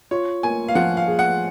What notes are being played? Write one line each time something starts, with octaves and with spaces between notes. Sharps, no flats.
F4 C#5
A#3 G#5
F5
F3 F#5
F5
G#4
F#5